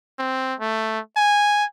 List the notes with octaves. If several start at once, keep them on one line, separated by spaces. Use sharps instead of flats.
C4
A3
G#5